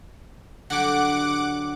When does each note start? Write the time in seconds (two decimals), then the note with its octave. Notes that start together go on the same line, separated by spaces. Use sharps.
0.70 D3 F#3 G3 F#5 D6